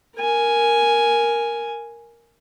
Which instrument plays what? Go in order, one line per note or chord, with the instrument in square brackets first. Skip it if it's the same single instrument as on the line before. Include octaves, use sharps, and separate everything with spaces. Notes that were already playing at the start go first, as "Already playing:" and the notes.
[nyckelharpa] A#4 G#5